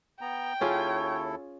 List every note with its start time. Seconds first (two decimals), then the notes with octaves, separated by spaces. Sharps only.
0.21 B3 G5 A#5
0.61 D#2 C#4 E4 F4 G#4 A4 C#5